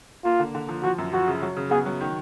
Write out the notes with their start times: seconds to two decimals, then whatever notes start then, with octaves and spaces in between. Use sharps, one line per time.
0.25 A#3 F4
0.39 D3
0.55 D3
0.69 F3
0.83 F3 F#4
0.99 F#2
1.13 F3 F#4
1.28 C#3
1.42 F#3
1.57 C#3
1.71 B3 G#4
1.86 F#3
2.01 D#3